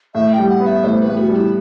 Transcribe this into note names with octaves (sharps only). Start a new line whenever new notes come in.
A2 E5
G5
G3
F#5
B3
E5
A2 C5
B4
A2
F#4
G3
E4